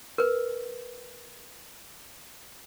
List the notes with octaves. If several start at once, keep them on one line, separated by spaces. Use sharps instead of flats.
A#4 B4